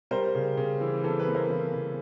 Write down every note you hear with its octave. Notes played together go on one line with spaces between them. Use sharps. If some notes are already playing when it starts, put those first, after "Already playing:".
G3 A#4 C5
C#3
C#3
E3
E3 A4
A4 B4
A#3
A#4 C5
E3
C#3